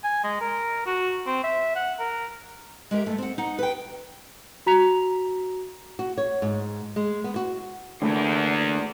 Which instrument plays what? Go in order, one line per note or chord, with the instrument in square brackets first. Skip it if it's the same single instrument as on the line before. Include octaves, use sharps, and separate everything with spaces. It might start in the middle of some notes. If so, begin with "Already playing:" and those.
[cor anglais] G#5
G#3
A#4
F#4
C4
E5
F#5
A#4
[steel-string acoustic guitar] G#3 G4 A#4 E5
G2 A3
C4 F#5
D#4 F#5
B4 G5
[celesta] F#4 A#5 B6 F7
[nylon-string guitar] F#4
C#5
G#2
G#3
B3
F#4
[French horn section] E2 [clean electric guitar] D3 A3 A#3